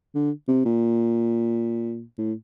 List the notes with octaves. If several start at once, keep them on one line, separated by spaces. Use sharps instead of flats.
D3
C3
A#2
A2